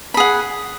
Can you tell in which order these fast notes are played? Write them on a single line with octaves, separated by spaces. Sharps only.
B5 G#4 F#5